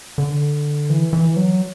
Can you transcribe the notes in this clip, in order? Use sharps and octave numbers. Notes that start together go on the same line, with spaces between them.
D3
E3
E3
F#3